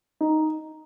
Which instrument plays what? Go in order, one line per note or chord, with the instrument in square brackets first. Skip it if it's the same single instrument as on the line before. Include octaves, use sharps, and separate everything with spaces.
[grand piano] D#4